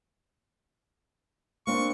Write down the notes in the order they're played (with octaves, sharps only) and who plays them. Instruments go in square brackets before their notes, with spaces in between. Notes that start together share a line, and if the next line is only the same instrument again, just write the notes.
[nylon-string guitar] A#3 C4 D4 [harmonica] C#6